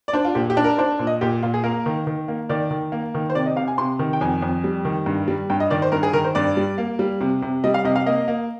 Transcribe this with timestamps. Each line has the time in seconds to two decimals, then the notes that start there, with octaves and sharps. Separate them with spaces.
0.08 D5
0.13 D4 C5
0.25 F4
0.35 A#2 G4
0.50 G4
0.57 D4
0.64 A#4
0.78 D4 C5
0.99 A#2
1.07 D#5
1.21 A#2 G4
1.43 A#2 F4
1.54 G#4
1.64 A#3 A#4
1.86 D#3
2.07 D#3
2.28 A#3
2.49 D#3 D5
2.71 D#3
2.92 A#3
3.14 D#3
3.30 C5
3.35 C3 D5
3.46 D#5
3.56 C3 F5
3.68 G#5
3.78 C3 C6
3.99 D#3
4.13 G5
4.21 F2 G#5
4.42 F2
4.64 G3
4.85 D#3
5.06 G2
5.28 G3
5.50 G2 G5
5.60 D#5
5.70 D#3 D5
5.82 C5
5.92 G2 A#4
6.03 G#4
6.13 D#3 A#4
6.24 C5
6.35 G2 D5
6.57 G3
6.78 A#3
6.99 G3
7.21 C3
7.42 C3
7.64 G3 D#5
7.74 F5
7.84 C3 D#5
7.96 F5
8.06 A#3 D#5
8.28 A#3